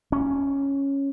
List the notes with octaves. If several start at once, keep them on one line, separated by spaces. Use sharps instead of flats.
C#4